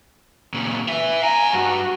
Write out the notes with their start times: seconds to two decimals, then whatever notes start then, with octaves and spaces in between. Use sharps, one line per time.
0.54 A#2 C#3
0.89 B4 E5
1.22 F5 G#5 A#5
1.53 G2 F#4